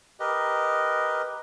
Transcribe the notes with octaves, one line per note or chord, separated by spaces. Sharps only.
G4 A#4 B4 D#5